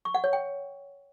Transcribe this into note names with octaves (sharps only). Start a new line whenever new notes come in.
C#6
F#5
C#5
G5